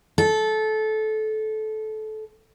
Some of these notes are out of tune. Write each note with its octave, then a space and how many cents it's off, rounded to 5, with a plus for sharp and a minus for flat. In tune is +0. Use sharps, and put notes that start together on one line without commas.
A4 -20